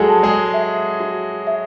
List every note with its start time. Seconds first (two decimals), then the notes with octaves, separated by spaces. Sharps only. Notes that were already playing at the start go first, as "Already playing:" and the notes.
Already playing: F#3 G#3 F#4 G#4 A4 C#5
0.09 A5
0.23 G#3 G#4
0.54 E5
1.00 F#4
1.47 E5